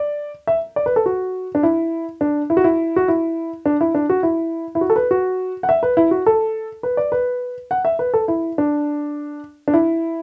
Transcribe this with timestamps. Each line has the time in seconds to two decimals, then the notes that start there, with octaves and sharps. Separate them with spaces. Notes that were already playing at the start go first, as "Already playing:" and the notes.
Already playing: D5
0.47 E5
0.76 D5
0.86 B4
0.96 A4
1.06 F#4
1.55 D4
1.63 E4
2.21 D4
2.50 E4
2.57 F#4
2.64 E4
2.96 F#4
3.08 E4
3.66 D4
3.81 E4
3.95 D4
4.09 F#4
4.23 E4
4.75 E4
4.81 F#4
4.90 A4
4.96 B4
5.11 F#4
5.63 F#5
5.69 E5
5.83 B4
5.97 E4
6.11 F#4
6.26 A4
6.83 B4
6.97 D5
7.12 B4
7.71 F#5
7.85 E5
7.99 B4
8.14 A4
8.28 E4
8.58 D4
9.68 D4
9.74 E4